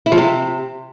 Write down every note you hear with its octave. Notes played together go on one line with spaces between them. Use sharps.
E4
F3
C3